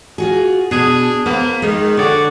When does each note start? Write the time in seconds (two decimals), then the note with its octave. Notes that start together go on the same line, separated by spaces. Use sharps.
0.18 F4 F#4 G#4
0.71 B2 D4 G#4
1.26 C#3 F3 A#3 B3
1.62 D#3 G#3
1.97 D3 F#4 C#5 D5